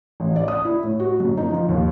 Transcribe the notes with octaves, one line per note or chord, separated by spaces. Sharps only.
A1
D5
D#6
E4
A2
F#4
F#2
D#4
F3
D#2